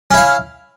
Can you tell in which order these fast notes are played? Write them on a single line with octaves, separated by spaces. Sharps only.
C#4 E4 F5